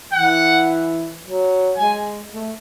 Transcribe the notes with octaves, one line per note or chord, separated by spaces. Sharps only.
E3 F#5
F#3
G#3 G#5
A3